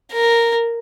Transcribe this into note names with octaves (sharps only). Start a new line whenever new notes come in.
A#4